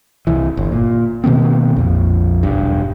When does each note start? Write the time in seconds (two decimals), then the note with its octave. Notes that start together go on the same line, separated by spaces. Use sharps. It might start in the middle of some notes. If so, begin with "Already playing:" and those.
0.27 C2 E3
0.57 G1
0.72 A#2
1.24 B2 D#3 A#3 C4
1.76 A#1 F2
2.43 E1 G2